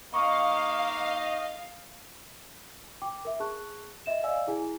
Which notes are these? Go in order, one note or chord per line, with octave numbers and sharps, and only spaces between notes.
A#3 D#4 D#5 F5 C#6 C7
G5 D6
A#4 E5
G#4 A5 C#6 F#6
D#5 E5 E7
D5 D#5 F5 G#5 E6
E4 G#4 G#5